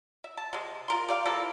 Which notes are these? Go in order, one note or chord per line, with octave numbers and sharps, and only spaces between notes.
E5
A5
C3 G#3
F4 A#4 C6
G4 D5 F5
E3 F3 A#3 A4